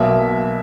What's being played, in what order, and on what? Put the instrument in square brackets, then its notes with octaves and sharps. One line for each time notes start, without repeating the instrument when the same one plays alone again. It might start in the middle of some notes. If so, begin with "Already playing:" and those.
Already playing: [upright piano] B1 B2 A#3 E5